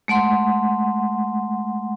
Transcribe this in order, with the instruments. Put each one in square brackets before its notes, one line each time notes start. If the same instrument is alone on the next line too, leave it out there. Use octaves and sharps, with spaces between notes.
[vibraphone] G#3 A3 F#5 C6